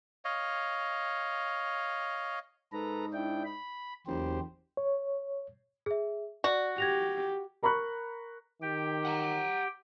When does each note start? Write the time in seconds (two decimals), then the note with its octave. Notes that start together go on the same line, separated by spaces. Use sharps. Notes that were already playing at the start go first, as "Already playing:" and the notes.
0.25 C#5 D#5 F5
2.72 G#2 A4 B4 A#5
3.14 D4 E4 G5
3.45 B5
4.07 F#1 E2 G4 C5
4.77 C#5
5.86 G#4 E5
6.44 F#4 D5
6.78 G4 G#6 A#6 F7
7.63 A#4 A#5 B5 C#6 F#6
8.62 D#3 G4 G5
9.05 F#5 G#5 A#5